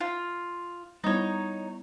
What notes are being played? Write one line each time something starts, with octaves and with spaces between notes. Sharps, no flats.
F4
G3 B3 D#4 E4 C#5